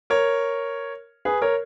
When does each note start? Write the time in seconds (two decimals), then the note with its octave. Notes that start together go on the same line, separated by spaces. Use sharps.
0.10 A#4 C#5
1.25 G#4 B4
1.42 A#4 C#5